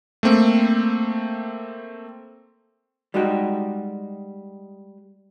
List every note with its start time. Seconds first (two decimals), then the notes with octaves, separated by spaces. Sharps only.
0.23 A3 A#3 C4
3.14 G3 G#3 D#4 F#4 G4